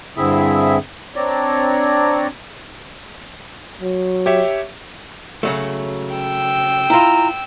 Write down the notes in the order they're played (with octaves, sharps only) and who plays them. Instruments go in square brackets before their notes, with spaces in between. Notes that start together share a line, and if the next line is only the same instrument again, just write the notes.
[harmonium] G2 D3 C4 E4 G#4 E5
C4 D4 C#5 D5 A#5
[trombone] F#3
[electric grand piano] G4 C#5 E5
[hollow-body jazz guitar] C#3 F#3 A3
[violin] G5 E6
[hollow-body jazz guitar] E4 F4 [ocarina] A#5